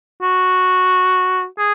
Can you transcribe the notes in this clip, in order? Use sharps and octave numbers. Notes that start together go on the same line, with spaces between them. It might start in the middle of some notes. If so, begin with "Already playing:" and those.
F#4
G#4